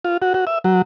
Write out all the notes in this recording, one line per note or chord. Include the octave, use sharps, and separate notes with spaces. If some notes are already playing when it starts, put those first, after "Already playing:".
F4
F#4
F#4
E5
F#3